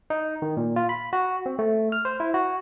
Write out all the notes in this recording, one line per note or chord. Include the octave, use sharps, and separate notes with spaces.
D#4
D#3
A#2
F4
B5
F#4
C4
A3
F6
C5
E4
F#4